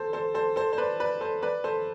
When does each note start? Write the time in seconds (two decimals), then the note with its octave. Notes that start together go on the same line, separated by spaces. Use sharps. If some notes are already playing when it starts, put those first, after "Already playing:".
Already playing: A4 C5
0.13 A4 C5
0.34 A4 C5
0.56 A4 C5
0.73 C5
0.78 B4 D5
1.00 B4 D5
1.21 A4 C5
1.42 B4 D5
1.64 A4 C5